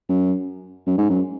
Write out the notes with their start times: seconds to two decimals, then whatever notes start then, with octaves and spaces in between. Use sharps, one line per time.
0.09 F#2
0.87 F#2
0.98 G#2
1.10 F#2